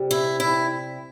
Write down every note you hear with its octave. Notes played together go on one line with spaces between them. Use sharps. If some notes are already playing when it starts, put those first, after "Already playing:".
Already playing: C3 G3
E4
E4